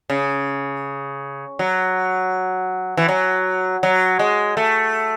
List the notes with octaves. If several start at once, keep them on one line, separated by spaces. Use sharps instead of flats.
C#3
F#3
E3
F#3
F#3
G#3
A3